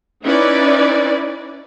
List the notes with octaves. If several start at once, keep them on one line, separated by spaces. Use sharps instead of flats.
C#4 D#4 E4 B4 D5